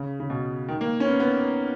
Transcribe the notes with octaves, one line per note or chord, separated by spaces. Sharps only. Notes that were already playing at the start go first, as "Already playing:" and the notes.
Already playing: C#3
C#3
B2
D#3
A#3
C#4
B3
B3